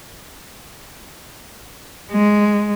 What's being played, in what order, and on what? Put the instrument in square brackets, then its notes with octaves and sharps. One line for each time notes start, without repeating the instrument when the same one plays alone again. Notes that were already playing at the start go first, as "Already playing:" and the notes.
[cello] G#3